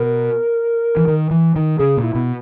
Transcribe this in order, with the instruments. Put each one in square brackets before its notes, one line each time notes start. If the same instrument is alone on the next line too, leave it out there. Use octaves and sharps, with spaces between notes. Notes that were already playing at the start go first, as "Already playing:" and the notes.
Already playing: [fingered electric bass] B2 [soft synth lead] A#4
[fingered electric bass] E3
D#3
E3
D#3
[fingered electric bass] C#3 [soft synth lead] G#4
[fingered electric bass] A#2
[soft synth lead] E4
[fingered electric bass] B2